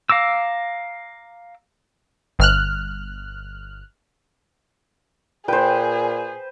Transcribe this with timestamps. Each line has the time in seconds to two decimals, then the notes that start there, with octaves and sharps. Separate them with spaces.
0.10 F5 A#5 D6 E6
2.39 G1 F6 F#6
5.48 A#2 G#4 B4 C5 G5